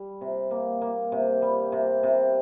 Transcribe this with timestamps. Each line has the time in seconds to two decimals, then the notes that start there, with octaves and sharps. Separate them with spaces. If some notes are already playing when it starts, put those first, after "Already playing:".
Already playing: G3
0.21 C3
0.51 A#3
0.81 A#3
1.12 C3
1.42 G3
1.72 C3
2.03 C3